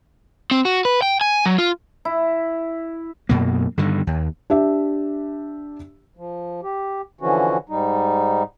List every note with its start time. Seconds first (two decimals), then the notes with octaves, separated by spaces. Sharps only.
0.51 C4
0.65 F#4
0.85 B4
1.02 G5
1.21 G#5
1.45 F#3
1.58 F4
2.05 E4
3.29 F#2 B2 A#3
3.78 G2 D3 D#3
4.07 D#2
4.50 D4 G4 E5
6.17 F3
6.63 G4
7.21 D3 E3 F3 C#4 F#4
7.69 G#2 G3 D#4